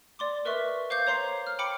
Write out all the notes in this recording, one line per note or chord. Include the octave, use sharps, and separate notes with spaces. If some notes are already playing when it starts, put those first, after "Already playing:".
D5 C6 D6
A#4 B4 D#5 E5 C6 C#6
C5 F5 D6 G6
C#5 A#5 C6 C7
F6
G5 B5 D6 C#7